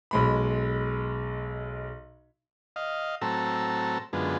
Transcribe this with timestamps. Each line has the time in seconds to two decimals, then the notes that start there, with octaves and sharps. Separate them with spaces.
0.11 B1 G#3 B5
2.76 D#5 F5
3.21 A2 F#3 C4 A4 A#5 E6
4.13 F#2 D3 G#3 B3 F4